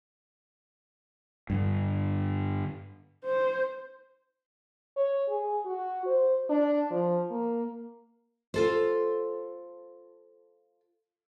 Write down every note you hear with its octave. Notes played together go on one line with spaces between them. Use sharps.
G2 D3
C5
C#5
G#4
F#4
C5
D4
F3
A#3
F4 A4 C5